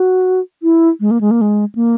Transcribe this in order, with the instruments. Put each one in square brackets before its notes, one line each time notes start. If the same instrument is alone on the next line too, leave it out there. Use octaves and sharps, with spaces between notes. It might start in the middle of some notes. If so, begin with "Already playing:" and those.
Already playing: [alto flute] F#4
E4
G#3
A#3
G#3
A#3
G#3
A#3